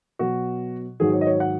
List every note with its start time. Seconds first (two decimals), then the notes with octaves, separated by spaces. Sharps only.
0.19 B2 F#3 F#4
1.00 G#2 D#3 F#3 G#4
1.13 C#5
1.21 D#5
1.27 C#5
1.40 F#5